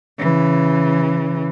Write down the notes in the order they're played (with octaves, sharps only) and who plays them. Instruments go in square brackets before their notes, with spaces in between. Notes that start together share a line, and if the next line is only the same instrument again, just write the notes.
[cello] C#3 E3